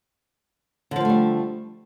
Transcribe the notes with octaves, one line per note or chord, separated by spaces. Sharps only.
D3 F3 G3 A3 A#3